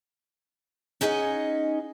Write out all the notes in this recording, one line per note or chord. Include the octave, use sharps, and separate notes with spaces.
C#4 D#4 G#4 D#5 F#5